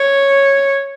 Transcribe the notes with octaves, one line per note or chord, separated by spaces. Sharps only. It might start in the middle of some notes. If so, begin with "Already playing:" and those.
Already playing: C#5